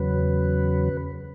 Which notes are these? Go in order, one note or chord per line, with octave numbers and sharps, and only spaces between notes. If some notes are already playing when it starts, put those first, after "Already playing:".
Already playing: E2 C#3 F#3 B4